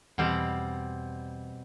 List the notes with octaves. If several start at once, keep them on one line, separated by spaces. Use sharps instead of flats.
E2 B2 G3 C4